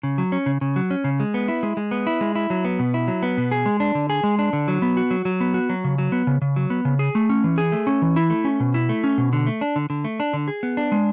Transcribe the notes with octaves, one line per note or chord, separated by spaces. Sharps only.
C#3
F#3
C#4
C#3
C#3
F#3
C#4
C#3
G#3
B3
E4
G#3
G#3
B3
E4
G#3
E4
F#3
B3
B2
E4
F#3
B3
B2
G#4
G#3
D4
D3
G#4
G#3
D4
D3
F#3
B3
F#4
F#3
F#3
B3
F#4
F#3
C#3
F#3
B3
C#3
C#3
F#3
B3
C#3
G#4
A3
C#4
E3
G#4
A3
C#4
E3
E4
A3
C#4
B2
E4
A3
C#4
B2
D3
A3
D4
D3
D3
A3
D4
D3
G#4
B3
D4
G#3